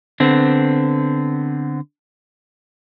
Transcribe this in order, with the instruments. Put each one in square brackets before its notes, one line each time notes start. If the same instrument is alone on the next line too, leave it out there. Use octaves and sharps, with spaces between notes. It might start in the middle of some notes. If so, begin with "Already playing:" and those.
[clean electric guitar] D3 B3 C4